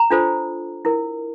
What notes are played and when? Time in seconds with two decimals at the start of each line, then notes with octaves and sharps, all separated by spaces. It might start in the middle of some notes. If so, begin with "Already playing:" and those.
Already playing: A#5
0.11 D4 F4 A4 C5
0.85 E4 A#4